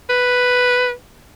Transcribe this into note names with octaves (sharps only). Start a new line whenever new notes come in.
B4